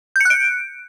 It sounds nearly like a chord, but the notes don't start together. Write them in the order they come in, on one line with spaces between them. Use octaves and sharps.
G6 C#7 F#6 D7